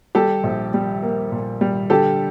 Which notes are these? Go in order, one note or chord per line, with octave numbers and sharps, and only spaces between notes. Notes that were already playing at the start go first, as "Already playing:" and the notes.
G3 G4 A4
A#1
G3
A#3
A#2
G3
D3 G4 A4